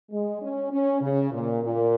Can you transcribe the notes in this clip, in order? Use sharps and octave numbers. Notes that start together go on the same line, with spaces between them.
G#3
C#4
C#4
C#3
A#2
A#2